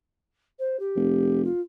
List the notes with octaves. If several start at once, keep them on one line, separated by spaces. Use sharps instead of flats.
C5
G4
F1
F4